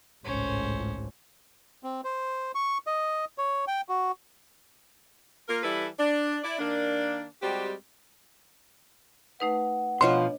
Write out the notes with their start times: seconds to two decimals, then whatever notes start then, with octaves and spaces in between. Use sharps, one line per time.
0.25 G#1 C#2 A2 C#4 C5
1.83 C4
2.04 C5
2.55 C#6
2.87 D#5
3.38 C#5
3.68 G5
3.89 F#4
5.48 A#3 F4 A#4
5.63 E3 G3 E4 A4 B4
5.99 D4
6.44 E4 D5
6.59 D#3 A#3 D4
7.43 G3 G#3 C4 F#4 G4
9.40 A3 D#4 B4 F#5
10.01 B2 F3 D4 F4 C#5 D#5 C6